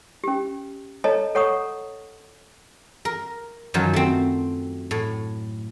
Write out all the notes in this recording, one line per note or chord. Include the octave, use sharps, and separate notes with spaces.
C#4 G4
A4 C#5 D#5 A5 A#5
A4 C#5 F#5 A#5 C#6 D#6
A#4
F#2 D#3 F3 F#3
A3 C4
A2